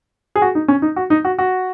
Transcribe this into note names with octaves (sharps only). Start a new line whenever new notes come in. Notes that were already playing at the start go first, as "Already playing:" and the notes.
G#4
F#4
D#4
C#4
D#4
F#4
D#4
F#4
F#4